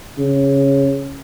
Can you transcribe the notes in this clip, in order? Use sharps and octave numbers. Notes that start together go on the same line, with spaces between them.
C#3